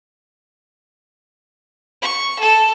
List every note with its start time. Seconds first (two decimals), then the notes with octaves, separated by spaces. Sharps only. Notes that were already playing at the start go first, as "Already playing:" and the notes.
2.02 C#6
2.39 A4